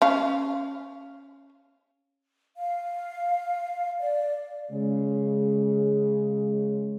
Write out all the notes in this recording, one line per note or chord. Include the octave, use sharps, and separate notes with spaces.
C#4 F5
F5
D5
C#3 G#3